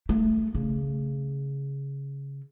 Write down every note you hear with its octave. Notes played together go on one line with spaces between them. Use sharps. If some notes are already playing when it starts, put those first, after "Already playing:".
A3
C#3